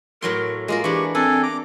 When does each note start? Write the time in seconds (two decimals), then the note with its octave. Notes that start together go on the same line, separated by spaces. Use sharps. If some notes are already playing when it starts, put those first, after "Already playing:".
0.22 A2 F#3 A#4 C6
0.68 G#3 A#3 F4 A#4
0.84 E3 D4 G4 C#6
1.15 C4 D4 A4 G#5
1.43 A#5 D6